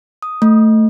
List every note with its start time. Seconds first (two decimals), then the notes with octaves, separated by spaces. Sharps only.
0.22 D#6
0.42 A3